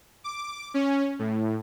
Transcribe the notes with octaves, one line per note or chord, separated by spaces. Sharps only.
D6
C#4
A2